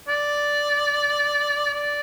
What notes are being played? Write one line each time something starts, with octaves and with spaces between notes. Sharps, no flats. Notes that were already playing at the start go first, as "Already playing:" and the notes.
D5
D5